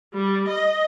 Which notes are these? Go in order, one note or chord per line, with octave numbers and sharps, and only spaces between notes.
G3
D#5